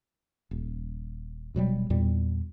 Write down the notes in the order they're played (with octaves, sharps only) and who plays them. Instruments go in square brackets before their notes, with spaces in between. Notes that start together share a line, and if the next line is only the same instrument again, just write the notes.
[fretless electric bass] D#1
D#1 B2 F#3 G3
E2 A#2 G3